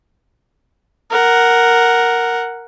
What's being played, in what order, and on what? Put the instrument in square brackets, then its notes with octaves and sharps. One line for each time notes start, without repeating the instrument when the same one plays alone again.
[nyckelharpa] A#4 F#5